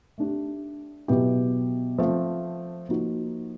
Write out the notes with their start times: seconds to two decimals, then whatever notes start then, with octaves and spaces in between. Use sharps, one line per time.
0.18 A3 D4 G4
1.08 B2 F#3 B3 E4 G4
1.98 F3 A3 C4
2.89 F3 A#3 D#4 F#4